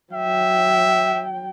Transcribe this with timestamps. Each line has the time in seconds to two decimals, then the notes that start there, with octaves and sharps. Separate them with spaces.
0.13 F#3 E5 G5